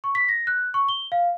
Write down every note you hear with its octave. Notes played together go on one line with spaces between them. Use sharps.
C#6
B6
A#6
F#6
C#6
G7
F5